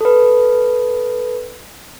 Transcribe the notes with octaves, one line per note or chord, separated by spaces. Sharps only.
A4 B4